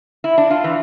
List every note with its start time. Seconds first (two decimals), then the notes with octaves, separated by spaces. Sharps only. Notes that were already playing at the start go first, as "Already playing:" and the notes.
0.24 E4
0.38 D4
0.51 F4
0.64 E3